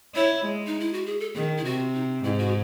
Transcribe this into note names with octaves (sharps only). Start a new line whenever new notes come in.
E4 C#5
G#3
D#4
E4
F#4
G#4
A4
D#3 G#4
E4
C3 F#4
D#4
G#2 E4
F#4